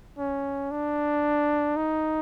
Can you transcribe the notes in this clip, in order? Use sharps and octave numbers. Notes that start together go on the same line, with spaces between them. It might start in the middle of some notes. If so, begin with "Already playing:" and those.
C#4
D4
D#4